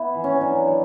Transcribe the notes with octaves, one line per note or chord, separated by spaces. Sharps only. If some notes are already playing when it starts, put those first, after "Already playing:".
Already playing: B3 E4
E3
C#4
F#3 D4
F#3